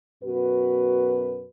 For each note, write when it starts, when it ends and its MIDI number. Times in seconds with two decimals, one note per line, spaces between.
0.23 1.44 42
0.23 1.44 47
0.23 1.44 66
0.23 1.44 71